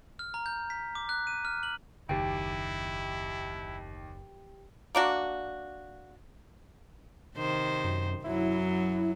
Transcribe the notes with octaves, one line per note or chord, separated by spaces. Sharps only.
F6
A#5
G6
B6
D6
F#6
D#7
F6
F#7
F#1 D#2 E4 G4 G5
A#3 D4 F#4
C3 D#3 C5
F#2
F#2 F#3 E4